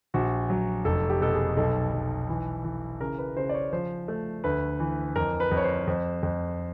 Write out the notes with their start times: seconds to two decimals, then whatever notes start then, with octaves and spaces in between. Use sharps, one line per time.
0.14 A#1 F#4
0.50 F#3
0.85 F1 A4
1.10 G4
1.21 B2 A4
1.33 G#4
1.57 B1 A4
1.93 B1
2.29 E3
2.64 E3
3.01 C#3 A#4
3.18 B4
3.37 C#3 C5
3.49 D5
3.54 C#5
3.73 F3 C5
4.08 A3
4.44 D2 B4
4.80 E3
5.16 F2 A#4
5.40 B4
5.51 F2
5.57 C#5
5.64 C5
5.87 F2
6.23 F2